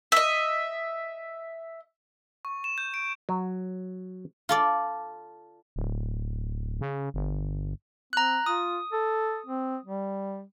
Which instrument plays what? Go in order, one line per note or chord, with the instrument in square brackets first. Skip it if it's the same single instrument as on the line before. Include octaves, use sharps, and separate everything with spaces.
[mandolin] D#5 E5
[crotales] C#6
E7
G6
D7
[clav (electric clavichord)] F#3
[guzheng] F4 A4 D5
[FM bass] D1
C#3
G1
[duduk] C4 [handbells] A#5 F#6
[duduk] F4 [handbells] D#6
[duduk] A4
C4
G3